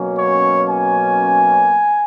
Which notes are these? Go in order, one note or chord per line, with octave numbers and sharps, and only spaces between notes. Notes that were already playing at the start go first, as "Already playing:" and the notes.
Already playing: B2 F#3 A#3 C#4
C#5
G#5